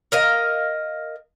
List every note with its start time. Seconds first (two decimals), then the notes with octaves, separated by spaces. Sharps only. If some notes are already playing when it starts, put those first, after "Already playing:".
0.12 A#4 D#5 F5